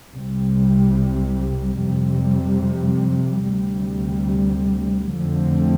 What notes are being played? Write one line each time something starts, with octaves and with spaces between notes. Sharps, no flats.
C2 C3 G3
F2 C3 G3
D2 C3 G3
F2 D3 F3 A3 C4